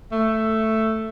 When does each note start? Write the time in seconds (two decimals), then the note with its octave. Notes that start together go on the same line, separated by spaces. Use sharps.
0.12 A3